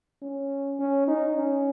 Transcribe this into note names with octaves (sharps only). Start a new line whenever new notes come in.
C#4
C#4
D#4
C#4